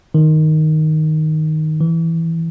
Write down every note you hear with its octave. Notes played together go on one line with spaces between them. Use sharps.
D#3
E3